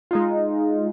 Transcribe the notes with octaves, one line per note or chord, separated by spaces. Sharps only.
G#3 D#4 F4